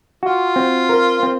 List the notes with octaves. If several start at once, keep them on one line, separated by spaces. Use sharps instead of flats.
F4 F#4
C4
A#4
C4